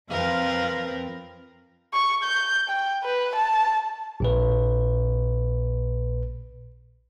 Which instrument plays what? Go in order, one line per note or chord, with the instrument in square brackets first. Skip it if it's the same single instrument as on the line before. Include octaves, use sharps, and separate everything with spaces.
[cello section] F2 F3 C4 [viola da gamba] A#4 B4 [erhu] F5
[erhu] C#6
G6
G5
B4
A5
[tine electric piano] A#1 A#2 B4